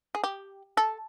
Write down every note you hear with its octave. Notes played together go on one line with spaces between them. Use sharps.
G#4
G4
A4